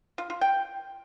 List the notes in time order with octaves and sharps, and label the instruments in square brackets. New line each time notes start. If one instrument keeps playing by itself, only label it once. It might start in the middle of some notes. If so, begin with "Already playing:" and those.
[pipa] F4
F4
G5